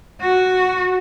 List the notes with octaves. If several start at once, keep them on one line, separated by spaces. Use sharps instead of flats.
F#4